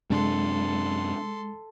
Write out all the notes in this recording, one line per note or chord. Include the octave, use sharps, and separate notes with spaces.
F#2 C3 G#3 D4 A4 C6